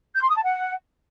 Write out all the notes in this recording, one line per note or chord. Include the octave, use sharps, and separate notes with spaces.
G6
C6
D#6
A5
F#5